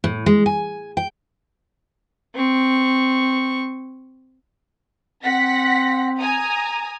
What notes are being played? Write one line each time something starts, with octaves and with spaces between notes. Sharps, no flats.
A2
G#3
G#5
G5
C4 C#6
C4 F#5 A#6 B6
G#5 A#5 D#6